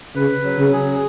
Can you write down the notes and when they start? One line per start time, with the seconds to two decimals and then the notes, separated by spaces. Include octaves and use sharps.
0.16 C#3 B4
0.44 F#3
0.58 C#3
0.73 G#4